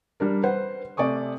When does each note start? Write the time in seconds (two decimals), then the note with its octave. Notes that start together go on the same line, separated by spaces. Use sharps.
0.20 G3 D4 A#4
0.44 B4 C5 F#5
0.97 C3 A3 D5 G#5 C#6 D#6